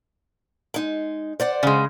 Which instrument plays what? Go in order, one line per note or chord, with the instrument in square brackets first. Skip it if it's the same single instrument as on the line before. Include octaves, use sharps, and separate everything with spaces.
[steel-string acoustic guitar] G#3 D#4
C5 D5 F#5
[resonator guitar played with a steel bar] C#3 G#3